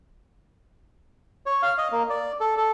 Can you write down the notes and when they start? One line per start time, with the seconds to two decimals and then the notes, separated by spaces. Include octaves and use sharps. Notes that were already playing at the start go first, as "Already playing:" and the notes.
1.46 C#5
1.63 F5
1.78 D#5
1.92 A#3
2.10 D5
2.40 A4
2.57 A4